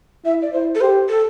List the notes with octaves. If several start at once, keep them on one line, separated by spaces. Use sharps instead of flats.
E4 E5
D5
E4 C5
A4
G4 C5
A4